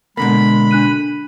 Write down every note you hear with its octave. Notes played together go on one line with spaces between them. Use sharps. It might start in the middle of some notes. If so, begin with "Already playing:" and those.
B2 D3 G#3 A#3 B5
D4 F#6 D#7